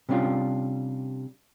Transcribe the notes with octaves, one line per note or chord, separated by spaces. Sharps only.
C3 G3 C#4 D4 F4